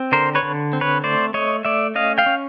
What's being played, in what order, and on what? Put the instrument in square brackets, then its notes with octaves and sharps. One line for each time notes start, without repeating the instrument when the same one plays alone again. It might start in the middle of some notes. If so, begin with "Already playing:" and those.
Already playing: [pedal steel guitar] C4
D3 A#4 C5
B4 C#5
D3
C4
B4 C#5
A3 C5 D5
A3 C#5 D#5
A3 D5 E5
C#4 D#5 F5
F5 G5
C#4